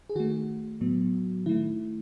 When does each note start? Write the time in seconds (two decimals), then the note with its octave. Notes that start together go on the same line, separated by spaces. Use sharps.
0.10 G#4
0.15 D#3 A3 F#4
0.81 A2 F#3 B3
1.46 D#3 A3 E4